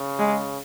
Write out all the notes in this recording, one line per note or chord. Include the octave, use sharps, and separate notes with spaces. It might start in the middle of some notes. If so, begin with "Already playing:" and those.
Already playing: C#3
G#3